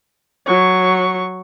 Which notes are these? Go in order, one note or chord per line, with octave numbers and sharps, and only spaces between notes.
F#3 C#6